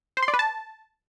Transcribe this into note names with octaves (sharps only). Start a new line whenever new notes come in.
C5
C6
D5
B4
A5